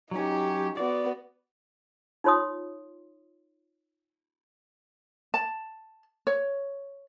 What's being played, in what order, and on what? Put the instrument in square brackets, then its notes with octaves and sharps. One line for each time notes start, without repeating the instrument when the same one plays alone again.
[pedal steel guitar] F#3 C#4 [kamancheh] D#4 G4
[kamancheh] B3 F#4 [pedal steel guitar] D5
[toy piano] D#4 F4 C#5 C6 D#6
[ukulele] A5
C#5